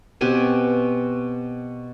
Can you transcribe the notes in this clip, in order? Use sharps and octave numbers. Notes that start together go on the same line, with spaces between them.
B2 C4 G4 G#5